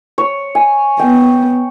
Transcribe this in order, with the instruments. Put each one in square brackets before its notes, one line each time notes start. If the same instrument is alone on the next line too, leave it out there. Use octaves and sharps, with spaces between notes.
[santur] C#5
G#5
[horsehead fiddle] B3 [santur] G5